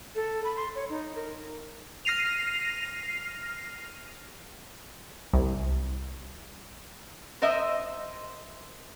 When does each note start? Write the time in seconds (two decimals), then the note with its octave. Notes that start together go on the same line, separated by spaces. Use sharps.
0.15 A4
0.44 B5
0.57 C6
0.75 C#5
0.90 D#4
1.15 A#4
2.05 F6 A#6 C7 D#7 F7
5.34 C2
7.42 A#4 C5 D#5 E5